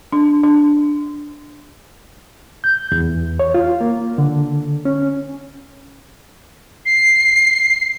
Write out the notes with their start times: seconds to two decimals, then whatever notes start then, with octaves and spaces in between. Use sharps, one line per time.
0.12 D4
0.43 D4
2.64 G6
2.92 E2
3.39 C#5
3.54 F4
3.81 A#3
4.18 D3
4.85 C#4
6.85 C7